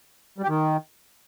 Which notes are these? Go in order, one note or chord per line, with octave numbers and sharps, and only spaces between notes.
G3
G4
D#3